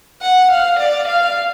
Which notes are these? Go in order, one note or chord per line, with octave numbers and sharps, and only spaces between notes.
F#5
F5
D5
F5